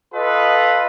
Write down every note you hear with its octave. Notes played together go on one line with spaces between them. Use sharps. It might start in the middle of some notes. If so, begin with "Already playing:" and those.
F4 A4 B4 D#5